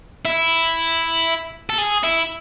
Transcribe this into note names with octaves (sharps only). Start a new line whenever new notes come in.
E4
A4
G#4
E4